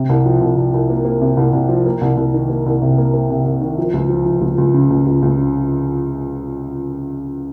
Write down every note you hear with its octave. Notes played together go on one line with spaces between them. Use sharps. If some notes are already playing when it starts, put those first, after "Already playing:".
Already playing: C3
C2
F3
C2
C2
C2
A#3
A#3
C3
C2
C2
F3
A#3
C2
C2
D#3
A#3
C2
C3
A#3
A#3
C3
C3
D#3
F3
C#2
F3
F3
C#2
C#2
C#3
C#2
C#2
C#2
C#3